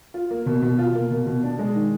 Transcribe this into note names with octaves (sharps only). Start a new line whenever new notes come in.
F4
A#3
B2
B2
F4
A#3
B2
B2
D4
G#3
D#3